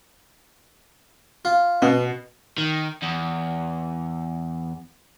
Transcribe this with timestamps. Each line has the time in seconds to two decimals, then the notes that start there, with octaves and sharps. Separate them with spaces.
1.45 F4
1.82 B2 B3
2.58 D#3
3.03 E2